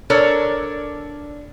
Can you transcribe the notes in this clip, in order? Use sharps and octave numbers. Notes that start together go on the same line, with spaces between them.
D4 A4 A#4 C#5 D5